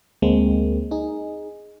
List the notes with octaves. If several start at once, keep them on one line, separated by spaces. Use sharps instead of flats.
D2 G#3 A#3 C4
D#4 G#4